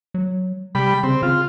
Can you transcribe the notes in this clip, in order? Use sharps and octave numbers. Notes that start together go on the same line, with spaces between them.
F#3
C3 G3 B5
C#3 C4
C#3 F4